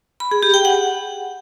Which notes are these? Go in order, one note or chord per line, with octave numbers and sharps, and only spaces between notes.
B5
G#4
G4
G5
F#5